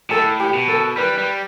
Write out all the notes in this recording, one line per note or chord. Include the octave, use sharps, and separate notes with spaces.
A2 A4
G4
B2
A4
G3 B4
G3